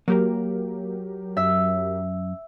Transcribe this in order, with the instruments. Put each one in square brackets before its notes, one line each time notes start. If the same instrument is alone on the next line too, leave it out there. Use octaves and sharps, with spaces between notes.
[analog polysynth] F#3 G4 A#4 [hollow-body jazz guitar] A#3
[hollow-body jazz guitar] F#2 [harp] E5